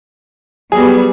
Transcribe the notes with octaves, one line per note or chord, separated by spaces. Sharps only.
F#3 G3 B3 G#4